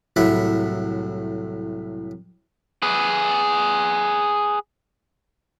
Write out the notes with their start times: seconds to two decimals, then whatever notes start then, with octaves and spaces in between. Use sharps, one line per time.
0.16 C2 A2 F#3 E5 F#5 B5
2.83 G#4 B4